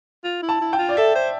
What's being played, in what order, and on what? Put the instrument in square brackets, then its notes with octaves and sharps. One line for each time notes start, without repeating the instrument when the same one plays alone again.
[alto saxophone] F4
E4
[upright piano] A5
[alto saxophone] E4
[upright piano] G5
[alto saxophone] F4
[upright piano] D5
[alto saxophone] A4 [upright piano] E5
[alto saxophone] C5